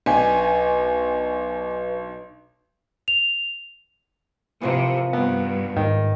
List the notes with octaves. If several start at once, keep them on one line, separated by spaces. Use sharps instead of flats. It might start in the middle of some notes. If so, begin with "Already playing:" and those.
B1 D4 B4 G5 G#5
F7
C3 E3 F3 A#3
G2 B3
G#2 D#3